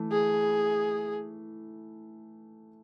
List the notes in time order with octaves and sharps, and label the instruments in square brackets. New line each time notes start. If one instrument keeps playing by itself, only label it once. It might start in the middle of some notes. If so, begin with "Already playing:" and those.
Already playing: [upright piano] E3 A3
[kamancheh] G#4